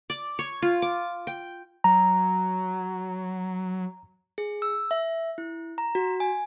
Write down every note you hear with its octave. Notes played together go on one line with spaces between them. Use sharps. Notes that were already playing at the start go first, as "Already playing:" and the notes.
D5
C#5
F4
D6
G5
F#3 A#5
G#4
E6
E5
E4
A#5
F#4
G#5